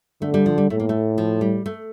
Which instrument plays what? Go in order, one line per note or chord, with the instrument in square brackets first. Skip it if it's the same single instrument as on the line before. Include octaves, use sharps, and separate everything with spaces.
[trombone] D3 [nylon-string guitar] A3
[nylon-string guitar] G3
F3
G3
[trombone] A2 [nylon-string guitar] A3
[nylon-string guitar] A#3
A3
F3
G3
A3